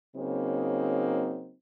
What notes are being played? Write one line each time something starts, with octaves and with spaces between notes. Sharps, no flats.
C#3 F#3 A#3 C4 D#4